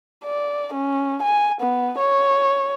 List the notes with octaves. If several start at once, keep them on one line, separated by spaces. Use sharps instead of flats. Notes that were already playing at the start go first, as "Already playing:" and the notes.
D5
C#4
G#5
B3
C#5